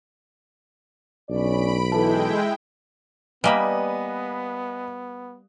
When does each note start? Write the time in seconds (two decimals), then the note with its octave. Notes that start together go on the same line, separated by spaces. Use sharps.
1.30 B1 C#4 D4 D5 B5 D7
1.92 E3 G#3 E4 A4 G5 A5
3.44 G3 A#3 B3 B4 D#5 G#5 B5